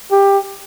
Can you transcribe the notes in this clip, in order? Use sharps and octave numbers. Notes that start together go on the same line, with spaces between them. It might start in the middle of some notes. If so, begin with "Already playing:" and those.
G4